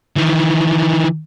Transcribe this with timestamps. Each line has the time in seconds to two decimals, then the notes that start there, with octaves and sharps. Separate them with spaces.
0.16 D#3 E3